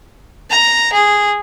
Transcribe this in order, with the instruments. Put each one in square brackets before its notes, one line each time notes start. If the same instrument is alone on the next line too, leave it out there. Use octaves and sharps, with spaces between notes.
[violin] A#5
G#4